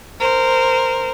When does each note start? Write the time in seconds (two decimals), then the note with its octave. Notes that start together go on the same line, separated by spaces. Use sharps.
0.20 A#4 C5